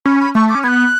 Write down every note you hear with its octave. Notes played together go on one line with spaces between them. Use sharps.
C#4 B5
B5
A3 C#6
D6
C#4
B3 F#6 G#6